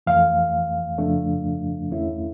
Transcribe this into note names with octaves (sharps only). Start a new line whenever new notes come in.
F2 E3 A3 F5
F2 C#3 F3 A3 D4
E2 D3 A3 C#4 E4